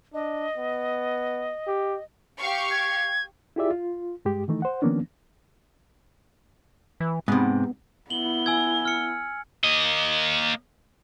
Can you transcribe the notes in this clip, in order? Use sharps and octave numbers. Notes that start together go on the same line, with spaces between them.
D4 D#5
B3
G4
G4 F5 C#6
G#6
E4 F4 G4 G#4 D5 E5
F4
G2 G#3 G4
D#3 E3 A3 D#4
C5 F#5
D#3 F3 A#3 B3 C#4 D4
E3
G#2 C3 B3
B3 E4 F#7 G7
G#5 E6 G#6
F6 C#7
A#3 D#5